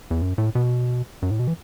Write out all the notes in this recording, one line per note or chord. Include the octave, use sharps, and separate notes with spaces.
E2
F#2
A2
B2
F#2
A2
B2
E3